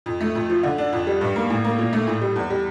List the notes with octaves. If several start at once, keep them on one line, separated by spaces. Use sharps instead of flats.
F2
A3
F2
F3
D3
D4
F2
G3
G2
A#3
A2
A#3
A#2
A3
A2
G3
E2
G3